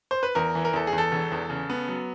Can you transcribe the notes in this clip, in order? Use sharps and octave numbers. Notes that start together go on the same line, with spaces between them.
C5
B4
E2 A#4
E3
A#4
E2 A4
G#4
E2
A4
E1
E2
C#3
B3
F#3